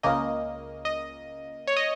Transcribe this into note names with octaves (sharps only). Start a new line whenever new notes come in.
C#2 C#3 A#3 D#5
D#5
C#5
D#5